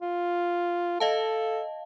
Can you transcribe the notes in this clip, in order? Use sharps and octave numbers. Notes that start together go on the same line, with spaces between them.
F4
A4 D#5 F5 A5